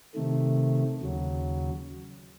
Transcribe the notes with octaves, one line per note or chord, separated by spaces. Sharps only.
C3 D#3 A3
D#2 C#3 F#3